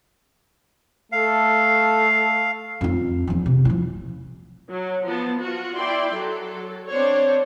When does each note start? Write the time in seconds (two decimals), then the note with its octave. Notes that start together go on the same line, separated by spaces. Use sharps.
1.12 A3 A4 F5
2.81 F2 D#4
3.27 E2 F3
3.46 C3
3.65 F3 E4
4.70 F#3
5.05 F3 B3 A5
5.39 F4 F#4
5.76 E4 D5 G5 C6
6.13 F#3 A4
6.89 C4 D4 C5 C#5